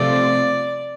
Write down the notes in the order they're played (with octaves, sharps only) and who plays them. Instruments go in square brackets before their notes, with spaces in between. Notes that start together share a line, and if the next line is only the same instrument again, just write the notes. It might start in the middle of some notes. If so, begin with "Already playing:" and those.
Already playing: [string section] C3 F3 A3 C4 F4 [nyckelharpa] D5